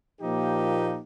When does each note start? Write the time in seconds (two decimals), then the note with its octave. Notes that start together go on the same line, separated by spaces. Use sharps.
0.20 A#2 F3 A#3 D#4 G4